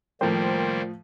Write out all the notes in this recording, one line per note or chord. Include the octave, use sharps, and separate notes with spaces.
A2 D#3 F3 G3 A#3 A#4 C5 G5